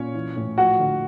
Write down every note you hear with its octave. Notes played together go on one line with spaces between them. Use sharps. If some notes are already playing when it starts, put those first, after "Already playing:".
Already playing: A#2 C#4 C#5
E3
A2
F3 F#4 F#5
D3